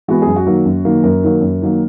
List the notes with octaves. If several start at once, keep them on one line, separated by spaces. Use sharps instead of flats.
E3 G#3 B3 F#4
F#2 G#4
F#4
D#3 F#3 A#3
F#2
D#3 F#3 A#3
F#2 A#4
D#3 F#3 A#3
F#2
D#3 F#3 A#3